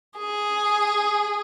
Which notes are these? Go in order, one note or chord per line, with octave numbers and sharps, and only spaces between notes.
G#4